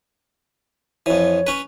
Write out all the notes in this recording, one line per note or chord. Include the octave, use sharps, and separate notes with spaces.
F2 E3 C#5
C#4 B4